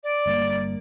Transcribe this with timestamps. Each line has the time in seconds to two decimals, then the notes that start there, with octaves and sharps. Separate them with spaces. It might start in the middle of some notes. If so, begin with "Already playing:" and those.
0.03 D5
0.26 G1 G3 A#3